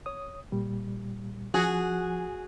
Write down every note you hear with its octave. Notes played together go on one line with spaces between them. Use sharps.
C#5 D#6
A#2 G3
F3 F#4 G#4